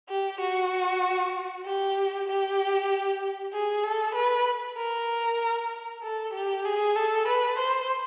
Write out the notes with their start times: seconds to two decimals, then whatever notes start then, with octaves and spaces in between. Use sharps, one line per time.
0.09 G4
0.41 F#4
1.65 G4
2.28 G4
3.53 G#4
3.84 A4
4.15 B4
4.78 A#4
6.03 A4
6.34 G4
6.65 G#4
6.96 A4
7.28 B4
7.59 C5